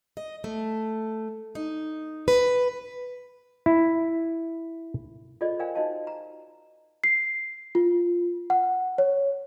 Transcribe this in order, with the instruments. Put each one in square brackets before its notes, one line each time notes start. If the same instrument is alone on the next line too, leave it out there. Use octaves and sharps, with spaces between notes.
[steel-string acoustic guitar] D#5
A3
D#4
B4
[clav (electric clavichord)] E4
[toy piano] F4 G#4 A4 C5 D5 D#5
A#4 C5 D5 F5 G5 G#5
D#4 F#4 C5 D#5 F5 A5
A#5
[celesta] C7
F4
F#5
C#5